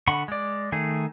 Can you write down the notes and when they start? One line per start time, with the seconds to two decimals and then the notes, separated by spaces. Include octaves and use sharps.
0.07 D3 F#5 B5 C#6
0.28 G#3 D5
0.72 D#3 A3 G#4